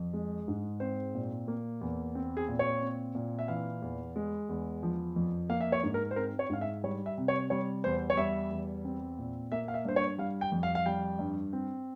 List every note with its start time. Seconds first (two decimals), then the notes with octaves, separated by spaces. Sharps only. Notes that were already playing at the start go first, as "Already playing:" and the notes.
Already playing: F2
0.13 G#3
0.48 G#2
0.80 C4 C5
1.14 A#2
1.48 A#3
1.81 E2
2.15 C4
2.37 G#4
2.48 A#2
2.59 C#5
2.82 C4
3.15 A#2
3.39 E5
3.48 E3 F5
3.82 E2
4.16 G#3
4.49 E2
4.83 F3
5.16 F2
5.49 A#3 F5
5.61 E5
5.72 C#5
5.83 G#2
5.94 A#4
6.11 C5
6.16 C4 A#4
6.39 C#5
6.50 G#2 F5
6.61 E5
6.84 G3 C#5
7.06 E5
7.18 C3
7.28 C#5
7.50 G3 C#5
7.84 E2 C5
8.10 C#5
8.17 G3 E5
8.51 E2
8.85 C4
9.19 A#2
9.52 A#3 E5
9.68 F5
9.74 E5
9.85 G2 C5
9.96 C#5
10.18 G3 F5
10.41 G5
10.52 F2
10.63 F5
10.75 F5
10.86 G3 G5
11.19 G2
11.53 C4